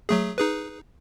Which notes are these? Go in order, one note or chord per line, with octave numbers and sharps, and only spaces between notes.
F#3 A3 G#4
D#4 G#4 B4